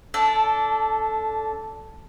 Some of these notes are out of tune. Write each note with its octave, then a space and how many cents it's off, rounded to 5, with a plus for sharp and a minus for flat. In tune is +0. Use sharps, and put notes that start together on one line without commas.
D4 -20 A4 +0